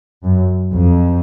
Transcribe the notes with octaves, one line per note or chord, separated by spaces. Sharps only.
F#2
F2